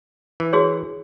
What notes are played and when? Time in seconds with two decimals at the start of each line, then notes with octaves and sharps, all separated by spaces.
0.40 E3
0.53 F#4 G#4 C#5